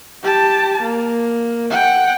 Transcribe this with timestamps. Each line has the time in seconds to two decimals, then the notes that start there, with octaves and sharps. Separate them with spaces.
0.23 G4 A5
0.82 A#3
1.70 F#5 G5